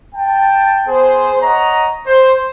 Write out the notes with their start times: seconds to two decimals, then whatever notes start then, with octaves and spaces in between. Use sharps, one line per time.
0.15 G5 A5
0.87 B3 G#4 C5
1.42 C#5 D#5 F#5 A#5
2.07 C5